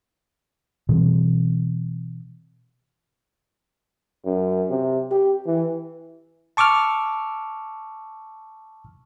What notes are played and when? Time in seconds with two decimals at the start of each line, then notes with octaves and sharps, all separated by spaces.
0.89 B2 E3 G3 C4
4.26 F#2
4.70 C3
5.11 G4
5.46 E3
6.57 A5 C#6 D6 E6 F6